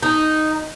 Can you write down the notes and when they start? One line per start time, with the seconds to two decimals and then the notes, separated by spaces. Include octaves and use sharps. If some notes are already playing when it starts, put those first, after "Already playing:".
0.03 D#4